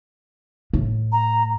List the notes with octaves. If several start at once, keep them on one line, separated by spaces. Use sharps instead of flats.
A2
A#5